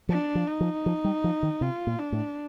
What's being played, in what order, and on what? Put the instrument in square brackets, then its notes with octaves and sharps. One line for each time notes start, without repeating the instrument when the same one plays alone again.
[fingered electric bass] F3 [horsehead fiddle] D4
[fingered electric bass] F3
[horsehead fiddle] D#4
[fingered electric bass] F3
F3
G3
F3
D#3
[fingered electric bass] C3 [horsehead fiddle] F4
[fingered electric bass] A#2
[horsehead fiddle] D4
[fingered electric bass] A2